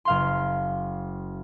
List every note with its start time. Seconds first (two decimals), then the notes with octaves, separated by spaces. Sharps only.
0.05 F#1 F5 C6